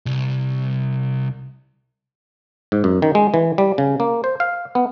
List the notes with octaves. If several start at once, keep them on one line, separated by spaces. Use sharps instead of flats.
C2
G#2
F#2
D#3
G#3
E3
G3
C#3
A#3
C5
F5
B3